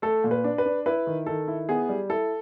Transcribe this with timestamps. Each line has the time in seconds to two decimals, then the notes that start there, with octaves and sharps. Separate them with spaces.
0.02 A3 A4
0.24 A#2
0.31 B4
0.44 D4
0.58 B4
0.66 D4
0.86 E4 B4
1.07 D#3
1.26 D#3 A4
1.48 E4
1.69 B3 G#4
1.89 G3
2.09 E4 A4